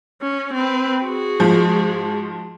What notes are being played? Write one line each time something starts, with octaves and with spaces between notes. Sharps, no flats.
C#4
C4 B4
F#4 G#4
G#2 F3